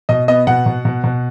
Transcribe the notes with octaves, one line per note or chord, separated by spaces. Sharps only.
B2 D#5
B3 D#5
B2 F#5
B2
B2
B2